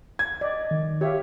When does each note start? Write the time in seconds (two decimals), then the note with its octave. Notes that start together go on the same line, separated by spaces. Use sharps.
0.19 G#6
0.41 D5 D#5
0.71 D#3
1.01 G4 C#5 E5 F5